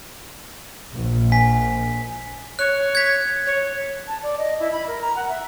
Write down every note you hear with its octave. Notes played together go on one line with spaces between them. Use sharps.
A#1
G#5 B6
C#5 F#6
G#6 B6
C#5
A5
D5
D#5
E4
B5
A#4
A#5
F#5
E5